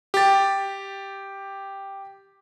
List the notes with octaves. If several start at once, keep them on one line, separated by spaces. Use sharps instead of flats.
G4 A6